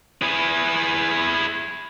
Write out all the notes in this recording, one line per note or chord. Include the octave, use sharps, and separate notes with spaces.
E4 G#4